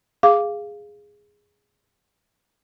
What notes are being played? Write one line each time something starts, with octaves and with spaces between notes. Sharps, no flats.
G#4 F5 D6